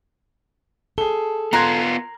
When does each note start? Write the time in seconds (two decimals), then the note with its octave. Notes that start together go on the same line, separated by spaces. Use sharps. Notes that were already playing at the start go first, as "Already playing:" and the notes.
0.98 G#4 A4 G7
1.53 B3 F4 A#4 C6 F#6 G#6